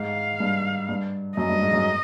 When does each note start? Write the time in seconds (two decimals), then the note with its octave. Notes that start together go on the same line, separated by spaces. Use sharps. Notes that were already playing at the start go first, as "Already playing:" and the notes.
Already playing: G#2 F5
0.40 G2
0.89 G2
1.37 F#2 D#5
1.49 G2
1.62 G#2
1.73 F#2